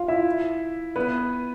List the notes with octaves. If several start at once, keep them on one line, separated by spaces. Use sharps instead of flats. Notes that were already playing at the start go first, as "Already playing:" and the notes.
Already playing: F4 F5
E4 E5
B3 B4